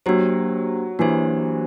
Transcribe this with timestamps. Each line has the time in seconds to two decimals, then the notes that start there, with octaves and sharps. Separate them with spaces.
0.06 F#3 A#3 D4 G4 C5
0.99 E3 A#3 D4 G4 C5